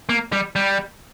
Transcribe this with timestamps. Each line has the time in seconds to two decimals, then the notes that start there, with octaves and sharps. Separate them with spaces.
0.09 A#3
0.32 G3
0.56 G3